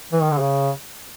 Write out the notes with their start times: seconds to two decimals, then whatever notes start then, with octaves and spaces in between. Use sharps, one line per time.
0.13 E3
0.22 D#3
0.31 D3
0.40 C#3